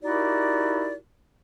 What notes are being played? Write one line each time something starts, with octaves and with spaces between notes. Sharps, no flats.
D#4 E4 F#4 G4 A#4 D5